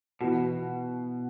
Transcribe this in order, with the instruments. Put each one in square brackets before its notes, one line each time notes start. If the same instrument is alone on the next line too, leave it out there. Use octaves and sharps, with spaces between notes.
[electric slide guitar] B2 [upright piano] E3 B3 F#4